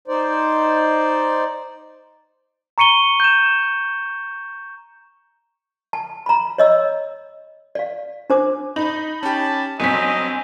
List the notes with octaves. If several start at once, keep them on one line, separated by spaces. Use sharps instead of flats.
D#4 C5 D5
A#5 C#6 C#7 D#7 G7
G6 E7
A5
A#5 B5
C#5 D#5 E6
D5 F5
D4 C5 D6
D#4 B5
C#4 G4 A5
G1 F#3 C4 D#5 G#5 B6